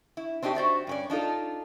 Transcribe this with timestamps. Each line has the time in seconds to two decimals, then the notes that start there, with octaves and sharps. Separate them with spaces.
0.17 E4
0.42 C4 D4 D#4 F4 G4
0.55 F#4 C5 D5 E5
0.87 G2 C#4 D5
1.10 D4 D#4 F4 A4